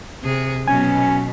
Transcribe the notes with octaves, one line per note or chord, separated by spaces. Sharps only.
C3 G#4
B2 F#3 C#4 G#5